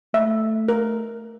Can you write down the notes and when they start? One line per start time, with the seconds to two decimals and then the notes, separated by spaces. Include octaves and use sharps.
0.14 A3 E5
0.69 A#4